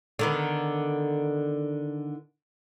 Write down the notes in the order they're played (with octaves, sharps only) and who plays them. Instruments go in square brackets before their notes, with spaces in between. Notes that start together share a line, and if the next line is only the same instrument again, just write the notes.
[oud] D3 D#3 B3